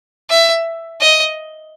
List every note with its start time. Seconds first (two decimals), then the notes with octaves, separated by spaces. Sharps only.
0.30 E5
1.00 D#5